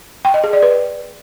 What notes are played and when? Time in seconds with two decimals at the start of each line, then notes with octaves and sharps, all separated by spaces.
0.25 G5
0.34 D#5
0.44 G#4
0.53 D5
0.62 B4